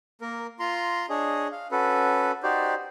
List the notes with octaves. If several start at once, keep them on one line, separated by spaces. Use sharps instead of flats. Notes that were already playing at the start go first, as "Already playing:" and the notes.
A#3 A#4
F4 A#5 C6
D4 G#4 C#5 D#5
F5
C#4 F#4 A4 B4
D#4 F#4 G4 C5 D5